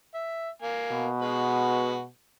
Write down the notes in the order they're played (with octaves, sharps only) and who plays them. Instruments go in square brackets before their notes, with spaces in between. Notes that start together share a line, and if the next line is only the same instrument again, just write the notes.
[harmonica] E5
A#3 G#5
[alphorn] B2
[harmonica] G#3 F#4 B4